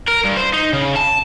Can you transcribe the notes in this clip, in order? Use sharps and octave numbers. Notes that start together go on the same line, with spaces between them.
A#4
G2
C5
D#4
C#3
A5